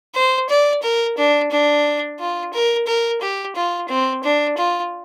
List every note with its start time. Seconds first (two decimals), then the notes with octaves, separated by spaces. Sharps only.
0.15 C5
0.49 D5
0.82 A#4
1.17 D4
1.51 D4
2.19 F4
2.53 A#4
2.87 A#4
3.21 G4
3.55 F4
3.89 C4
4.23 D4
4.57 F4